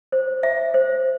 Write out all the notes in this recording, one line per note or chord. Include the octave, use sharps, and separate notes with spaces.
C5
E5
C5